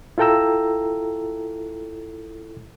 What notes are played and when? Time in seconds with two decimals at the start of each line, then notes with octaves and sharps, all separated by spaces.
0.18 E4 F4 A4 G5 A#5 E6